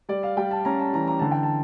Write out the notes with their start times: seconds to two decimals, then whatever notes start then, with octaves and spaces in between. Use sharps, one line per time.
0.09 G3 D5
0.23 F5
0.37 G3 G5
0.51 A5
0.65 C#4 A#5
0.79 A5
0.93 E3 A#5
1.07 A#5
1.19 D3 A5
1.31 G5
1.43 A5